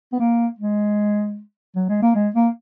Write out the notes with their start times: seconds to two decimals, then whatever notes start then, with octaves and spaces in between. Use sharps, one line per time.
0.13 B3
0.19 A#3
0.59 G#3
1.76 F#3
1.89 G#3
2.02 A#3
2.15 G#3
2.35 A#3